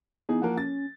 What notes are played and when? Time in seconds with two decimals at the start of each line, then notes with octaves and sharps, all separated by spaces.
0.29 E3 B3 D#4 G#4
0.42 F3 A#3 A#4 F#5
0.58 C#4 A6